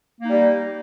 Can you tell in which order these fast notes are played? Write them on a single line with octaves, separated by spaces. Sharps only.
A#3 D#4 G3